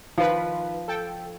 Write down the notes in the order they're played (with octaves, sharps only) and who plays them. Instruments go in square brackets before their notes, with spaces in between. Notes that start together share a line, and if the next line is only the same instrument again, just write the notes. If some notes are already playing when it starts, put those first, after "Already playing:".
[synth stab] D#3 F4 B4 [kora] F3
[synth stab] A4 G5